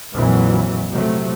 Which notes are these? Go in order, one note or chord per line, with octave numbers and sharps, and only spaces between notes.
A#1 F2 A#2 E3 F#3
C3 F3 F#3 A3